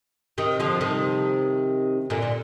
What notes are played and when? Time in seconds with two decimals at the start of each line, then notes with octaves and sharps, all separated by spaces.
0.38 C3 D#3
0.60 D3 F3
0.81 C3 D#3
2.10 A#2 D3
2.22 A#2